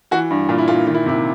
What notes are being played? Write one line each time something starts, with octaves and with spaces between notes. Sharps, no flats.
E3 F#4
G2
A#2 F4
E4
A#2 F4
D#3 F4
E4
C3 E4